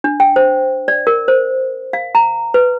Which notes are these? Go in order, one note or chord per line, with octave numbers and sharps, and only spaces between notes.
D4
G5
C5
D5
A#4
C5
F5
A#5
B4